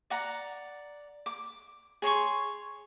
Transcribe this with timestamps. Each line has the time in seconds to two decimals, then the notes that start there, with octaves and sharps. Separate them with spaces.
0.10 D5 F#5 A#5
1.26 D6
2.02 G#4 C#5 C6 C#6